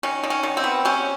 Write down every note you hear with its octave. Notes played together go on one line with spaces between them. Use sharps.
D#3 C#4
D#3
C#4
D#3
C4
B3
C3 C#4